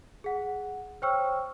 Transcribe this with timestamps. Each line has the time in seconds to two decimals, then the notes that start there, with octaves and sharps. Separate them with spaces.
0.24 G#4 F#5
1.02 C5 C#5 G5 C#6 E6 F6